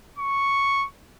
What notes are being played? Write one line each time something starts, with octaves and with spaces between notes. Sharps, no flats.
C#6